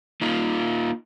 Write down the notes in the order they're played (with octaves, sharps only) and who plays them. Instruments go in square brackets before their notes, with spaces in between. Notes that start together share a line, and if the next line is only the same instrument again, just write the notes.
[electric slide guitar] A#3 D#4 F4